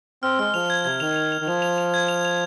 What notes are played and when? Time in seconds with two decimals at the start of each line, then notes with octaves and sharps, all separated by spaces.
0.23 C4 F6
0.39 G#3 F6
0.54 F3 F7
0.70 G#6
0.85 C3 G#6
1.00 D#3 F7
1.16 F7
1.32 F7
1.41 D#3
1.47 F3 F7
1.62 F7
1.78 F7
1.94 G#6
2.08 F7
2.25 F7